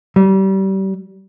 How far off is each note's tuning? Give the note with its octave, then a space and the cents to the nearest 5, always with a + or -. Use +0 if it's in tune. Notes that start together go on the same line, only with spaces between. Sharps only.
G3 -30